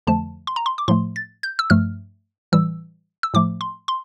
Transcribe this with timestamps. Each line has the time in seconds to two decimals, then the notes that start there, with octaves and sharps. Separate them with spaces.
0.07 F2 D3 F3 A3 A5
0.47 C6
0.56 A#5
0.66 C6
0.78 D6
0.88 A2 F3 A3 C6
1.16 A6
1.43 G6
1.59 E6
1.70 G2 F3 A3 F6
2.52 A2 E3 G3 E6
3.23 E6
3.34 A2 F3 A3 D6
3.61 C6
3.88 C6